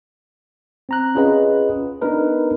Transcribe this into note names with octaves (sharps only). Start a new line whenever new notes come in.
C4 A#5 F#6
C#4 F4 G#4 B4 D#5 F#5
B3 D4 D#4 A#4 B4